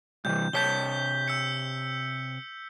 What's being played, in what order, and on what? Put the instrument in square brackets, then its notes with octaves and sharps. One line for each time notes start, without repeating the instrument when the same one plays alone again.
[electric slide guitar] G2 C3 E3 [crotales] G6
[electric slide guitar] C3 C#5 A5 [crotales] G6 B6 G7
[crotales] E6 G6 C#7